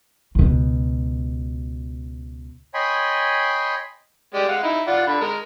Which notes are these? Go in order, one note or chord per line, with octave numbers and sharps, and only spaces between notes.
C#2 B2
C#5 D#5 G5 G#5 B5 C6
G#3 G4 D5
G#3 F5 F#5
D#4 E4
F4 D5 F#5
D3 B5
G#3 A#4